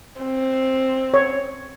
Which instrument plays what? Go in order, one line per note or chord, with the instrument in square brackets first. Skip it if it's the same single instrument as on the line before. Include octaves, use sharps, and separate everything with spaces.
[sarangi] C4
[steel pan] C#5